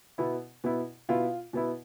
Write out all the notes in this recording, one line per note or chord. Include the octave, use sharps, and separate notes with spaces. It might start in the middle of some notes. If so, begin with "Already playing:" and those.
B2 B3 E4
B2 B3 E4
B2 B3 E4 F4
B2 B3 E4